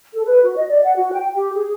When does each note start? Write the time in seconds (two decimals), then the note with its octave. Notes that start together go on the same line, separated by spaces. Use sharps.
0.13 A4
0.27 B4
0.43 F#4
0.57 D#5
0.70 D5
0.84 F#5
0.97 F#4
1.13 G5
1.34 G4
1.54 G#4